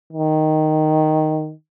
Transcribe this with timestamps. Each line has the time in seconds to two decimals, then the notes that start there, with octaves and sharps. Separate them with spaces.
0.13 D#3